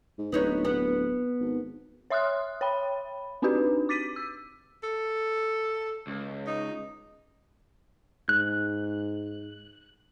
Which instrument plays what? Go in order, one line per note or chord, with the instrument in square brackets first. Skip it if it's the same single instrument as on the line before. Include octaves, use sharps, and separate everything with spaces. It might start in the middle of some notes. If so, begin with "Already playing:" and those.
[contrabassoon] G#2
[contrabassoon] D1 [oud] B3 D#4 C#5
[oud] B3
[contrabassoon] G#1
[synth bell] C#5 E5 C6 D#6 F6 F#6
C#5 G5 B5
C4 D4 D#4 F#4 G4 B4
D6 A6 B6 D#7
E6
[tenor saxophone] A4
[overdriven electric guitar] C#2
[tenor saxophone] D#4
[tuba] G#2 [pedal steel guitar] F#6